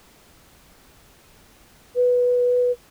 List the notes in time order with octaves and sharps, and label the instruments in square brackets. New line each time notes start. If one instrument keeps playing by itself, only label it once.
[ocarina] B4